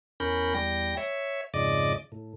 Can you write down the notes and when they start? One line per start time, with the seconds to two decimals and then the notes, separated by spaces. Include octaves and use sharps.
0.20 E2 C#4 A#4 B5 G6
0.54 E2 G3 G5 A#6
0.97 C#5 E5
1.54 F2 G#2 C#3 D5 D#5 D6
2.12 A2